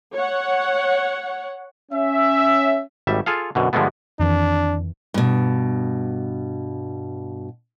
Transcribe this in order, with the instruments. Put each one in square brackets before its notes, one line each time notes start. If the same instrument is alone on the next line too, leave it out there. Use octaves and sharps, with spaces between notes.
[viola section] C#5 F#5
[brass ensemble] C#4 E5
[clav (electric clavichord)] G#1 G3 E5
F4 G#4 A4 F5
F#2 B2 D3
G2 D3 F3 G#3 A3 B3
[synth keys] F2 D#3 E3 [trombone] D4
[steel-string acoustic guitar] G2 B2